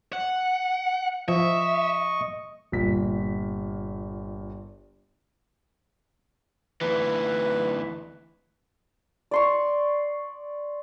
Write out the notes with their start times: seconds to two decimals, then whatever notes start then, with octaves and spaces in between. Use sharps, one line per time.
0.13 F#5
1.28 F3 D#5 E5 C#6
2.72 G1 A#2 B6
6.81 D2 E3 B4
9.31 D5 C6 C#6